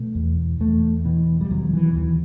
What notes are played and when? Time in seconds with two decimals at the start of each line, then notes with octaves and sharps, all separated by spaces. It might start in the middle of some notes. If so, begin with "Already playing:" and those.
Already playing: B2 A3
0.15 E2
0.60 E2 A3
1.05 B2 E3
1.41 G3
1.50 D#2 F#3
1.73 E3
1.95 D#2 E3